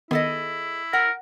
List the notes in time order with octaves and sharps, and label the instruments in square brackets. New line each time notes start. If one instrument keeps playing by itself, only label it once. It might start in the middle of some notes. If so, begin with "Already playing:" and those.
[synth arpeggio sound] D#3 B3 [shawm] E4 [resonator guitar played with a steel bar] G#4 A4 D#5
[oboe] A#4 [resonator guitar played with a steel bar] F#5